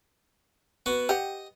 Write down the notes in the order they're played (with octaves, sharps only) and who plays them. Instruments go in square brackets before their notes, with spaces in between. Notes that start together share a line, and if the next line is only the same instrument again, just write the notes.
[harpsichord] B3 F#4
[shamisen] G4 F#5 [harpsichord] D#5